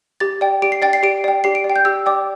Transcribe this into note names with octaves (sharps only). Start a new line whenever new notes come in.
G4 A6
D5 G5
G4 D7
C7
D5 G5 A6
C7
G4 D7
D5 G5
G4 C7
D7
D5
G5
G6
G4 E6
D5 G5 D6